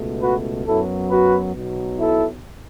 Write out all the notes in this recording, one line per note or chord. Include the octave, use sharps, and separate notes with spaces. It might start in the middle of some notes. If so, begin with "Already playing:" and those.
Already playing: C#2 B2 A3
F#4 B4
F#2 F#3 B3 E4 A4
F#4 B4
B1 B2 F#3
E4 A4